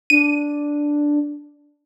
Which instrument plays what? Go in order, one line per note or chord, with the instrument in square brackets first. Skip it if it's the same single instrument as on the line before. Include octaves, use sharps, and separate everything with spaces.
[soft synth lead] D4 [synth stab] D#7